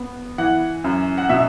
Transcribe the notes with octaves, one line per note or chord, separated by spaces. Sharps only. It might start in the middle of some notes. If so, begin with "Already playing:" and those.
Already playing: B3
E3 F#5
F#2
F#5
B2 E5